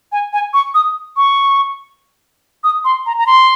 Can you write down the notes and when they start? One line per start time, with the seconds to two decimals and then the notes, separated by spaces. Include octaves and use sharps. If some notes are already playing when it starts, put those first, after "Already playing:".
0.12 G#5
0.33 G#5
0.54 C#6
0.75 D#6
1.17 C#6
2.64 D#6
2.85 C6
3.06 A#5
3.18 A#5
3.27 C6